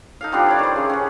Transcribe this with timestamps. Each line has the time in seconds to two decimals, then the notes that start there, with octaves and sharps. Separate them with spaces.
0.21 D#4 A4 F5
0.32 F3 G3 C4 D4
0.46 E4 C#5 D5
0.59 D#3 C5
0.76 C#3
0.90 C#4 B4